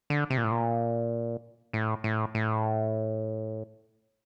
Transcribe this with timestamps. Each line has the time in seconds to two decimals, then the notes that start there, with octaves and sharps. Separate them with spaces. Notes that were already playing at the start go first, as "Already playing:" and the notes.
0.10 D3
0.30 C3
0.37 A#2
0.44 A2
0.51 A#2
1.73 A2
2.04 A2
2.35 A2